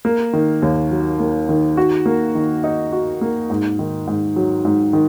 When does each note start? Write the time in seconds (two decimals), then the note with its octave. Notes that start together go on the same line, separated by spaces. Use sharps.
0.05 A#3
0.33 D#3
0.62 D#2
0.91 F#3
1.20 A#3
1.49 D#3
1.77 F#4
2.06 A#3
2.35 D#3
2.64 D#4
2.92 F#4
3.21 A#3
3.50 G#2
3.79 D#3
4.07 G#2
4.36 F#3
4.65 G#2
4.93 D#3